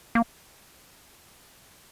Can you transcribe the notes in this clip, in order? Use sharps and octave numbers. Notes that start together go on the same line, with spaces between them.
A#3